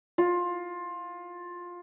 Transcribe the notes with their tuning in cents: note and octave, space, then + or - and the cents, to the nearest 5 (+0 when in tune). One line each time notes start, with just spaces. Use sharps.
F4 +15